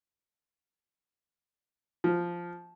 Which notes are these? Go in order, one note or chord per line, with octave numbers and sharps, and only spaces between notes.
F3